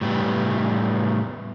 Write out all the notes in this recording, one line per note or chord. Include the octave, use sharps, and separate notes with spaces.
A2 G3 B3